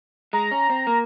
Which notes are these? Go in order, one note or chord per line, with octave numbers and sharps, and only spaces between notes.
G#3 A#5
C#4
C4
A#3